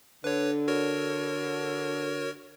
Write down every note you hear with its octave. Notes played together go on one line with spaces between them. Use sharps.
D3 B4 C#5
F#4 A#4 C#5